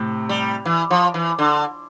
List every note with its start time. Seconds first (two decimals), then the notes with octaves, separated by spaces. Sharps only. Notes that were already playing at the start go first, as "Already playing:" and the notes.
Already playing: A2 C3
0.29 G3
0.65 E3
0.91 F3
1.14 E3
1.39 D3